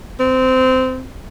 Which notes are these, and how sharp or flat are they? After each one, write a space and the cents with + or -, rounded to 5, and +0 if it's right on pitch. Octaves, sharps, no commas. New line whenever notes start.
C4 -20